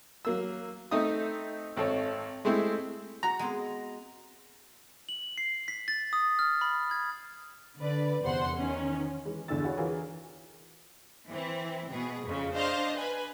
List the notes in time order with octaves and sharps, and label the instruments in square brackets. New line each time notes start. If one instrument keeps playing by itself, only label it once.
[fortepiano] F#3 A#3 E6
A3 C4 D#4 E5 D#6
G#1 C4 A4 C#5
G#3 A3 C4 E4
[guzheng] F#4 [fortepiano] A#5
[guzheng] G#3 B3 C4
[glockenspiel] F#7
C7
B6
A6
D#6
F6
B5
G#6
[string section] D3 B4 D5
E2 C3 C5 F#5 C6
D#3 C#4
[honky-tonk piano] E3 G#3
G1 E2 D3 G#4 E6 A6
E4 F#4 G#4 C#5
E3 F4 F#4 G#4 A#4 C#5
[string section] E3 C4
B2 G#4
F2 C#3
D4 C5 D#5 F5
B4 G#5